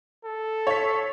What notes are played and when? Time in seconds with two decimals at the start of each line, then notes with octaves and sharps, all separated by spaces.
0.25 A4
0.67 C#5 B6